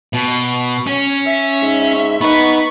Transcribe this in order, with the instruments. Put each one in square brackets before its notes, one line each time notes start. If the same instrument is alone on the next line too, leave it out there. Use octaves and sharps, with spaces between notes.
[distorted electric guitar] B2
C#4
[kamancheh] E5
[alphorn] G#2
[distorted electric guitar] B3 B4 [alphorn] D#4 [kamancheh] B5 C#6